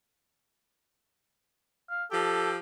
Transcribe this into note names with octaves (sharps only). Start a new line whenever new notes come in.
F5
F3 G4 A4